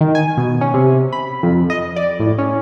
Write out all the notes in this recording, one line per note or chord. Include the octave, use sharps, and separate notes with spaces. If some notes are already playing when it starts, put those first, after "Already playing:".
D#3
G#5
B2
C#4
C3
B5
F2
D#5
D5
A2
C#4